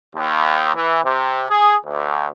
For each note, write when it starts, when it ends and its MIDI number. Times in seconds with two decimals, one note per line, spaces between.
0.16 0.74 39
0.75 1.02 52
1.04 1.44 48
1.50 1.75 68
1.86 2.27 38